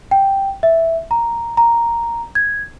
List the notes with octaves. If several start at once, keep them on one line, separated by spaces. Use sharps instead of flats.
G5
E5
A#5
A#5
G#6